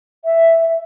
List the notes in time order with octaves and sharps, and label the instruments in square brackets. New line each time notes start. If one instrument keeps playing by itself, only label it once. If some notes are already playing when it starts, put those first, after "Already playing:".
[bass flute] E5